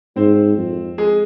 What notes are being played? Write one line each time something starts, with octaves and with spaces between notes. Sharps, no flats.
G#2 C4 C5
F2
G#3 G#4